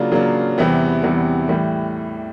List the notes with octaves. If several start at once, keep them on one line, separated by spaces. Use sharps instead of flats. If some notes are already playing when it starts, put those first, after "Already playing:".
Already playing: C#3 F#3 A#3 D4 F4
C#3 F#3 A#3 D4 F4
E2 C3 E3 G3 B3
E2 C3 E3 G3 B3
A2 E3 G3